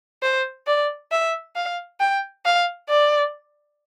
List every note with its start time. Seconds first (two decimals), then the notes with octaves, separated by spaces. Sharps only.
0.23 C5
0.67 D5
1.12 E5
1.56 F5
2.00 G5
2.45 F5
2.89 D5